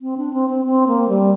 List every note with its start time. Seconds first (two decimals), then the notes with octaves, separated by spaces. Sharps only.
0.02 C4
0.18 D4
0.34 C4
0.50 C4
0.66 C4
0.87 A#3
1.09 G3